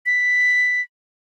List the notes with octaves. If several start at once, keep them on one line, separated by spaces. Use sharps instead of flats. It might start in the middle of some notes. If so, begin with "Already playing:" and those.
B6